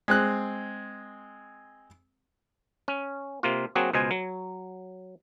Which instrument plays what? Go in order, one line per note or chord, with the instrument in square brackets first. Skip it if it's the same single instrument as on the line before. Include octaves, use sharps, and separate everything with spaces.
[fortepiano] G#3 C4 F#6
[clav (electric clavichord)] C#4
C3 A#3 F4
F#3 A#3 C4 F#4 G#4
C#2 B2 C5 D#5 G#5
F#3